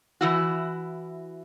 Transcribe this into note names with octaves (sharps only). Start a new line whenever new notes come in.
E3 E4 F#4